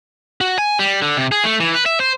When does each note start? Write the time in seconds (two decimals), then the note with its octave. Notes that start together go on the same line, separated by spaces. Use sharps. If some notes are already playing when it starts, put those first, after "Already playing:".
0.41 F#4
0.58 G#5
0.79 G3
1.02 D3
1.17 C3
1.32 G#4
1.44 A3
1.60 E3
1.74 B4
1.86 E5
2.00 C5